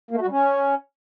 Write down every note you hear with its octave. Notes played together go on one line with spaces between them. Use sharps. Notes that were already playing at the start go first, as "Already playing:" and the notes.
A#3
A3
F#4
G3
C#4